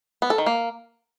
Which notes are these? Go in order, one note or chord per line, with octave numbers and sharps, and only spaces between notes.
B3
A4
D#3
A#3